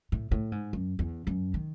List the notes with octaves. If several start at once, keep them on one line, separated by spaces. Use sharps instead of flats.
A2
A2
G#2
F#2
E2
F#2
D#3